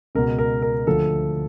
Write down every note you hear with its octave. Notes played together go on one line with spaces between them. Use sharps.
C#2 B2 A#4
A#4
A#4
D2 D3 F3 A4